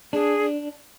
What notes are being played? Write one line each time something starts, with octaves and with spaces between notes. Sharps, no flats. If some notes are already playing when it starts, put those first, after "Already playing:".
D4 G#4